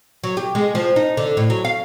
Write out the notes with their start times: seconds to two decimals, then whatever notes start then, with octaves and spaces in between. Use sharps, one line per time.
0.24 F#3
0.37 G4
0.55 G#3
0.75 F3
0.96 D#4
1.17 D3
1.37 A2
1.50 F#3
1.65 F5